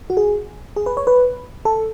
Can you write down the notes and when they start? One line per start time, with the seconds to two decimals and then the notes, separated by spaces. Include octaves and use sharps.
0.10 F#4
0.17 G#4
0.76 G#4
0.86 B4
0.97 C#5
1.07 B4
1.65 A4